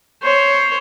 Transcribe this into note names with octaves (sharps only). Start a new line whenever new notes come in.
C5 C#5